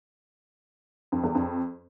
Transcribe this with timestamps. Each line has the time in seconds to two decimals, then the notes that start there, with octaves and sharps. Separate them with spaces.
1.12 F2
1.24 E2
1.35 F2